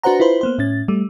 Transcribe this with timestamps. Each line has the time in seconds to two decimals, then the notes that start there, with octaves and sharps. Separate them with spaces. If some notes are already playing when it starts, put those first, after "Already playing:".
0.03 D4 F#4 B4 C5 F#5 A#5
0.20 E4 F4 B4 C5
0.41 A#3 B3 C5
0.58 A2 C#4 A6
0.88 G3 A3